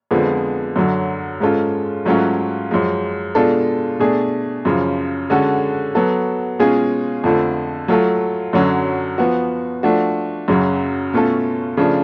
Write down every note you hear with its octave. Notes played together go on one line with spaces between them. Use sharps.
F2 D3 F3 G#3 B3
F#2 D3 F#3
G#2 G#3 C#4 F4 A4
G#2 F#3 A3 C#4 F4
F#2 F3 G#3
B2 G#3 D4 F4 A4
B2 A3 D4 G#4
F#2 C#3 F3
D3 G#3 C#4 F#4 A4
F#3 B3 F#4 A4
B2 G#3 C#4 F4 G#4
F2 D3 F3 A3
F#3 A3 F4 A4
F#2 D3 F#3 C#4
F3 B3 F#4
F3 A3 D4 F#4
F#2 C#3 F#3
B2 A3 C#4 F4 A4
C#3 F3 A3 D4